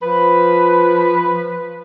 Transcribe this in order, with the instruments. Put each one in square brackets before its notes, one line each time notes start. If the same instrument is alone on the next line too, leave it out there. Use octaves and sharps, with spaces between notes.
[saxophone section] F3 B4